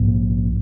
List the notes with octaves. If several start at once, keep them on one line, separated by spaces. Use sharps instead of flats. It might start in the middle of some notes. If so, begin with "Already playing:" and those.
Already playing: A#1 G#2